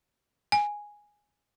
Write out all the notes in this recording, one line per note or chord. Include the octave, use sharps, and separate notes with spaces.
G#5